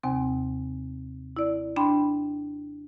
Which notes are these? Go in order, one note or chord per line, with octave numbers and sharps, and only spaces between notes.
D#2 C3 C4 G#5
E4 D5
D4 G5 B5 C6